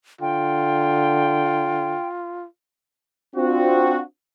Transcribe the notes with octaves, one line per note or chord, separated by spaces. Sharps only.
D3 F4 G5
C4 D4 F4 F#4